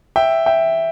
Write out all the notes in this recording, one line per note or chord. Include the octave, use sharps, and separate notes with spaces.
E5 G5
E5 G5